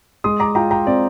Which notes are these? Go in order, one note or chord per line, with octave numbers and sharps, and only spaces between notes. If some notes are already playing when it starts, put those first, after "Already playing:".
G#3 C6 D#6
A#5 D6
F4 G5 A#5
G5 A#5
C4 D5